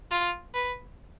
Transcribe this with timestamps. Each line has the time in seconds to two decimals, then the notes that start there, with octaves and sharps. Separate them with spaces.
0.11 F4
0.54 B4